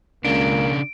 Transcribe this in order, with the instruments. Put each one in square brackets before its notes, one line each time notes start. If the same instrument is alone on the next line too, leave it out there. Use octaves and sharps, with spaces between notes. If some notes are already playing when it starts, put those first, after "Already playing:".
[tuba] C#2 [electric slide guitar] C#3 D4 [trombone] A#3 [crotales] D7